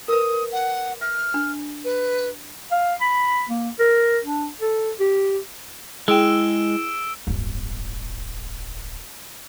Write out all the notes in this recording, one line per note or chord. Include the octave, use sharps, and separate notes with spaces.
A#4 B4 D#6
F#5
E5 F6
D4
B4
F5
B5
A#3
A#4
D4
A4
G4
G#3 E4 G#4 G5 E6 D7 E7
D1 G1